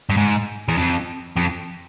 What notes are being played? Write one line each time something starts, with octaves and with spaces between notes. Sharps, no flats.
G2
G#2
E2
F2
F2